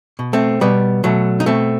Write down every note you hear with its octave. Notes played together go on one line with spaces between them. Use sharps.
B2
A3 C4
B2 G3 B3
B2 F#3 A3
D#4
B2 A3 C4